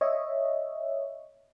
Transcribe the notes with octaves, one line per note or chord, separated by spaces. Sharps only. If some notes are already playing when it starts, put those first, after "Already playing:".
C#5 D#5 E5